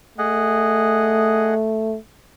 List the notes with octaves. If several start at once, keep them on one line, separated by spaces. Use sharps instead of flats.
A3 G#4 D#5 F#5